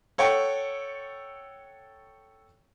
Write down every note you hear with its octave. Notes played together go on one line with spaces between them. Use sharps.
A4 C#5 F#5 G5 C#6